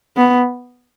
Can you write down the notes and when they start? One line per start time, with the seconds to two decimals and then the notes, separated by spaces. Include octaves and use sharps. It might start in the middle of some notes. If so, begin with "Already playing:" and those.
0.17 B3